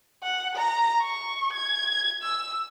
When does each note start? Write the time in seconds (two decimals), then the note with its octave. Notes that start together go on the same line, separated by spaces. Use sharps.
0.23 F#5
0.56 A#5
1.01 C#6
1.53 G#6
2.23 E6